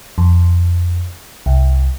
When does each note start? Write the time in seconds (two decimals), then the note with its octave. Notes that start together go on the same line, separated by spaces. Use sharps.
0.18 F2
1.46 C2